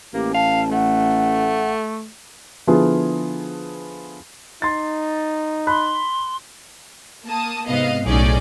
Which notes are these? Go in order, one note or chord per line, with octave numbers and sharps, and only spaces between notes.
A1 A#3 G4
F5 A5
A3 F#5
D3 F3 B3 E4 F4 G#4
D#4 C6 A6
B5 C6 F#6
A#3 A5 D#6
G#2 C3 B3 D#5 F5
B1 A2 C#4 D#4 G#4 D5